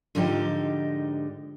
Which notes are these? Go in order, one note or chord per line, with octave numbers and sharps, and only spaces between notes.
G#2 D3 F3 D#4 G4